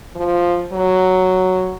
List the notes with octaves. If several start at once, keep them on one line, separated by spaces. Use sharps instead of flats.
F3
F#3